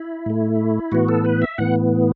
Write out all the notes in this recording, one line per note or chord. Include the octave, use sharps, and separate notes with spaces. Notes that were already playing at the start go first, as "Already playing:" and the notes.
Already playing: E4
A2 A3
A2 E3 B3 F#4
A4
B4
E5
A2 E3 B3 F#5